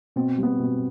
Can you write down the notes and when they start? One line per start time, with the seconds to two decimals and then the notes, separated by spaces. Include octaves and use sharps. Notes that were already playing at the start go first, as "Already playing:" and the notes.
0.16 B2 C4
0.38 G3
0.43 B3
0.60 B2